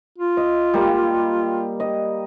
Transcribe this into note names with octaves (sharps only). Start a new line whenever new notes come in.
F4
D#5
G3 A#3
D#5